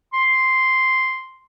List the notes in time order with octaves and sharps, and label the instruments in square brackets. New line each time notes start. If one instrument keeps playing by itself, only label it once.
[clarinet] C6